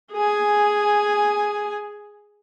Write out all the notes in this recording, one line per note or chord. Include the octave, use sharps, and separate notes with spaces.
G#4 G#5